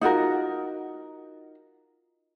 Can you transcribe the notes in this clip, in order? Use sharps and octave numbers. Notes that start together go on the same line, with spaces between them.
D#4 F4 F#4 A#4